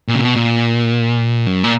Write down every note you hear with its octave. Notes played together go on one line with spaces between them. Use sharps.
A#2
C#3
B2
A#2
F#2
A#2